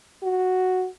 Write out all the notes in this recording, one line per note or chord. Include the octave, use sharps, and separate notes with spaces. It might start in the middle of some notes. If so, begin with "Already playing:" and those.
F#4